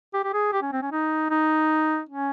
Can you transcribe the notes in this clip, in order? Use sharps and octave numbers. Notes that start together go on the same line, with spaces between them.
G4
G4
G#4
G4
C#4
C4
C#4
D#4
D#4
C#4